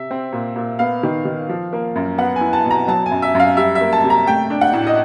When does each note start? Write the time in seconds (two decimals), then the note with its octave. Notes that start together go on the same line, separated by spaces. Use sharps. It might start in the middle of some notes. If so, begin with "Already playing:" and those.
Already playing: C3 E5
0.11 C4
0.33 A#2
0.56 A#2
0.79 B3 F5
1.03 D#3
1.25 D#3
1.49 F3
1.73 A#3
1.96 F#2
2.18 B3 F#5
2.36 G#5
2.41 E4
2.53 A5
2.65 B2
2.71 A#5
2.88 F#3 A5
3.06 G#5
3.11 F#2
3.22 E5
3.35 F#2 F5
3.57 G3 E5
3.75 E5
3.81 A#3
3.93 A5
4.04 C3
4.10 A#5
4.27 A3 G5
4.50 D4
4.61 F#5
4.73 A2
4.87 D#5